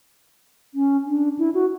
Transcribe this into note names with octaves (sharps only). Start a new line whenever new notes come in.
C#4
D4
E4
F#4